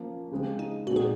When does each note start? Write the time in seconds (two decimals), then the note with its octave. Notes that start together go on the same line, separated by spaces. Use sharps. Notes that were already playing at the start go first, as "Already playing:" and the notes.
Already playing: F3 A#3 C#4
0.32 C#3 G#3 C4
0.59 D#4
0.87 A#2 G#3 C4 D#4 F#4
0.96 G#4